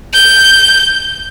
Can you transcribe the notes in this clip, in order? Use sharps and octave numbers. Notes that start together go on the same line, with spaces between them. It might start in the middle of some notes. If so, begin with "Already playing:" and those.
G6